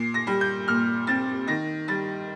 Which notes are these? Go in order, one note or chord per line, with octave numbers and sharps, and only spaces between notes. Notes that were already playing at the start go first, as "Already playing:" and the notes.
Already playing: A#2 C7
A#6
G3
G6
A#2 F6
C4 A6
D#3 A#6
G3 A6